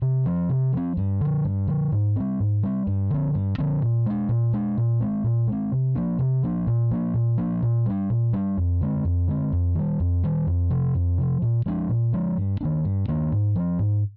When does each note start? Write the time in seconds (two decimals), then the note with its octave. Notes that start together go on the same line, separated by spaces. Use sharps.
0.02 C3
0.26 F3 C4
0.49 C3
0.73 F3 C4
0.97 G2
1.21 D3 F3
1.44 G2
1.68 D3 F3
1.92 G#2
2.16 G3 C4
2.40 G#2
2.63 G3 C4
2.87 G2
3.10 D3 F3 C4
3.34 G2
3.58 D3 F3 C4
3.82 A#2
4.06 G#3 D4
4.29 A#2
4.53 G#3 D4
4.77 A#2
5.00 G#3 C4
5.24 A#2
5.48 G#3 C4
5.72 C3
5.95 F3 A#3 D4
6.19 C3
6.43 F3 A#3 D4
6.67 A#2
6.91 F3 A#3 D4
7.14 A#2
7.38 F3 A#3 D4
7.62 A#2
7.86 G3 D4
8.10 A#2
8.33 G3 D4
8.57 F2
8.81 D3 G#3 C4
9.04 F2
9.28 D3 G#3 C4
9.52 F2
9.75 D#3 G3
10.00 F2
10.23 D#3 G3
10.47 F2
10.70 C3 F3
10.95 F2
11.18 C3 F3
11.42 A#2
11.66 F3 G#3 D4
11.89 A#2
12.13 F3 G#3 D4
12.37 G2
12.61 D#3 A#3 D4
12.85 G2
13.08 D#3 A#3 D4
13.32 G#2
13.56 F3 C4
13.79 G#2